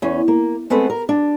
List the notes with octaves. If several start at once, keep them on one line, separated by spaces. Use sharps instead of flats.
E2 C#4
A#3
G#3 A3 B3 C4 B4
A#4
D4